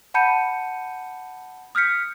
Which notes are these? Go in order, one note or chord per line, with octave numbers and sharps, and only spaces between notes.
F#5 A5 B5 G6 C#7 D#7
D#6 F6 G6 B6 C#7